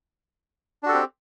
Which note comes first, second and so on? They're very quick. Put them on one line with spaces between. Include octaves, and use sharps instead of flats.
D4 F#4 A4 G4 C4